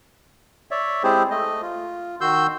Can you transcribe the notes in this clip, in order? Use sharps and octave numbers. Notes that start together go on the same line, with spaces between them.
C#5 D5 E5
G#3 C4 E4 G4 G#4 C5
A3 D#5
F4
D#3 F#4 C6 E6 G6